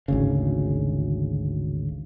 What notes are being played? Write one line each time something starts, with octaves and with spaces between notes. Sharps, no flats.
G#1 D2 C#3